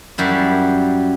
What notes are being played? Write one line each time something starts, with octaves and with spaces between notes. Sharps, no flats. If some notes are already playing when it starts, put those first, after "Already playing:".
F#2 G3 E4